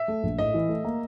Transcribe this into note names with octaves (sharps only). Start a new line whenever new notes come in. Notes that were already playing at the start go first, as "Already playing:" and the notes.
Already playing: E5
A3
A#1
A2 D#5
E3
A3
A#3